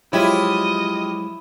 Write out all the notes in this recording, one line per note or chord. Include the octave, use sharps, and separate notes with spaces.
F3 F#3 G#3 E4 F4 G4 C#5 D#5